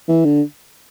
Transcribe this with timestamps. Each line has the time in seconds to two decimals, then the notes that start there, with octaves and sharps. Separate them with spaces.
0.08 E3
0.25 D3